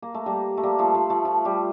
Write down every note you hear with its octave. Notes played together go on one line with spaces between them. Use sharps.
A#3
A3
G3 A#3
A3
G3 A#3
F3 A3
F3 A3
F3 A3
F3
G3